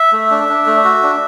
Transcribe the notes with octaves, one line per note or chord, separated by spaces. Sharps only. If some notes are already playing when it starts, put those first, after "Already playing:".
Already playing: E5
A3
D4
D4
A3
F#4
D4